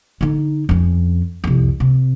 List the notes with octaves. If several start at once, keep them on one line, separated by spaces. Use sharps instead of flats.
D3 D#4
F2 C#4
C2 F2
C3